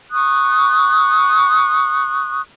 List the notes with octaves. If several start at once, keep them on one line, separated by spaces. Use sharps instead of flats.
C#6 D#6 F#6